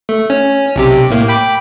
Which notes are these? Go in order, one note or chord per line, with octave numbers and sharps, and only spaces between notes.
A3
C#4
B1 C3 G4
A2 A#3
G5 B5 D6